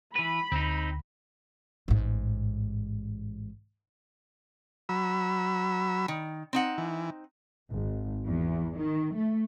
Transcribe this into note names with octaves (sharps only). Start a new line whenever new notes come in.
E3 B4 B5
D2 C4 D#4
A1 G#2
F#3 B5 E6
D#3
C4 D#4 F#5
E3
G#1
E2
D#3
A3